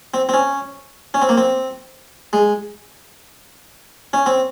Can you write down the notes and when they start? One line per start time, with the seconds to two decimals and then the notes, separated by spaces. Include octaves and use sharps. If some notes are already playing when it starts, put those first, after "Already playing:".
0.14 C4
0.29 C4
0.34 C#4
1.14 C#4
1.22 C4
1.29 A#3
1.37 C4
2.33 G#3
4.13 C#4
4.26 C4